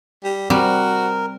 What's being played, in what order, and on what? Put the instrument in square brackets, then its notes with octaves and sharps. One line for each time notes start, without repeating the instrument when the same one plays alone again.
[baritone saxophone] G3
[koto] G3 [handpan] C4 [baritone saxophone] F#4 [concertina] A#4